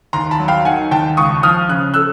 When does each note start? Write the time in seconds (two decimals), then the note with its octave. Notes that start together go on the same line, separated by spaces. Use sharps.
0.13 D#2 A#5 C6
0.31 A5 B5
0.40 F#3
0.48 F5 G5
0.65 D#3 F#5 G#5
0.91 D#2 G5 A5
1.17 C#2 C#6 D#6
1.43 F3 D#6 F6
1.69 C#3 F#6
1.94 A3 E6 F#6